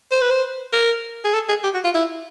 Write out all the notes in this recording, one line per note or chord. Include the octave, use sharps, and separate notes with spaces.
C5
B4
C5
A#4
G#4
A4
G#4
G4
F#4
F4
E4